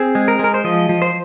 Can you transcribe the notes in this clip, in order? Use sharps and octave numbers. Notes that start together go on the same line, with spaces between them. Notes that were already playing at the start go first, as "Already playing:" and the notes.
Already playing: C4 G#4
G#3
A#4
G#3 A#4
C5
F3 D#5
F3
C5